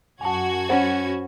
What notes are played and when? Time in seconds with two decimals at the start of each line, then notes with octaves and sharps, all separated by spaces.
0.21 F#2 F#4 G#5 A5 G#6
0.69 C#4 C5 F#5 B5